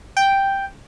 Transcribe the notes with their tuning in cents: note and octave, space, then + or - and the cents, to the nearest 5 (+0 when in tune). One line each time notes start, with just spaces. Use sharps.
G5 +0